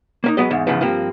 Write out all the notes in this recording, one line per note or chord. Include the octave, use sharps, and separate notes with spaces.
A#3 C#4 D#4
F#3 G#3 B3 D#5
E2 G#2
E2 G#2 C#3 E3 F3
G2 F3 A#3 C4